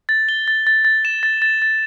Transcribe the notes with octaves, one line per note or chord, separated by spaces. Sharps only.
A6
G7
A6
A6
A6
E7
A6
A6
A6